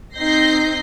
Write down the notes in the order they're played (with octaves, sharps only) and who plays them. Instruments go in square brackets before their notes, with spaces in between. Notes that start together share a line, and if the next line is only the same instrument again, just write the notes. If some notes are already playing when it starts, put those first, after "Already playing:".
[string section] C4 D#4 G6 A#6 C7